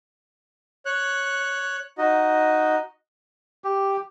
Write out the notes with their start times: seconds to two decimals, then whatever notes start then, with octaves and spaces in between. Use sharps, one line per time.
0.86 C#5 F#6
1.98 D#4 F#4 D#5
3.64 G4